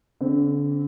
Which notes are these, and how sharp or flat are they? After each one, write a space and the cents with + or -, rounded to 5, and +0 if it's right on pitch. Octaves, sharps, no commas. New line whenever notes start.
D3 -40 C4 +0